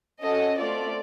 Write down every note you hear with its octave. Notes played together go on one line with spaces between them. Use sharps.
C#4 F#4 A4 D#5
A3 C4 F4 D5